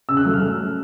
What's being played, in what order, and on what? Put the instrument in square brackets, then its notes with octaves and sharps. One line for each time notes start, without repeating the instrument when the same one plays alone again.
[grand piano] C#3 E6
F#6
F#3 A3
F6